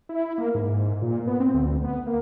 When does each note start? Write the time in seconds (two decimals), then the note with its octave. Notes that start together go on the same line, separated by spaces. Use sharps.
0.09 E4
0.38 A#3
0.55 G#2
1.02 A#2
1.27 B3
1.40 C4
1.54 D2
1.84 B3
2.07 A#3